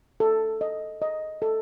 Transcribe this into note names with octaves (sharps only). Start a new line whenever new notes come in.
A4
D#5
D#5
A4